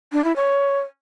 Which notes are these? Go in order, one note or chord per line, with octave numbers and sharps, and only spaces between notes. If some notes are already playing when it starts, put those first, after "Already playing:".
D4
E4
C#5